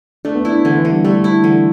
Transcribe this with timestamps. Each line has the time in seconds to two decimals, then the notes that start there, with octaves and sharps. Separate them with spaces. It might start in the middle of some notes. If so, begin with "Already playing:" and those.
0.25 A3 D4
0.35 B3
0.45 D4 E4
0.65 D3 E3
0.79 E3
0.85 D3
0.91 G3
1.04 G3 A3
1.24 E4
1.44 D3 E3